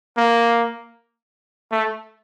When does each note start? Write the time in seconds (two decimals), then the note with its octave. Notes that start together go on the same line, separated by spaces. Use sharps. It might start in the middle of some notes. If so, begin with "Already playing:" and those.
0.17 A#3
1.72 A3